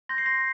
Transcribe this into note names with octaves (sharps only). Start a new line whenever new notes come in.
C6 G6 A#6
C7
A#6